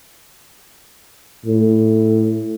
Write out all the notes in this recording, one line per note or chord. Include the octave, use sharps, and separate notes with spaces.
A2